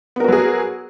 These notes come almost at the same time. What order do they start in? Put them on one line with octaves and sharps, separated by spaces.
B3 A#4 F#4 F#3 G#4